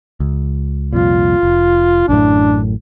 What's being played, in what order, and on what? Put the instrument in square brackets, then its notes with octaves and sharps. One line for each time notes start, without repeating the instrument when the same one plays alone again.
[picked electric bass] C#2
[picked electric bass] C2 F2 A#2 [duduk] F4
[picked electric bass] F1
[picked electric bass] A1 F#2 A2 [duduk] D4